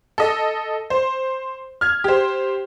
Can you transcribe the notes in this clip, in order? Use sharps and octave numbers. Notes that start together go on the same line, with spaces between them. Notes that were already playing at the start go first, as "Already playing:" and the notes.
A4 D#5
C5
F6 G#6
G4 C5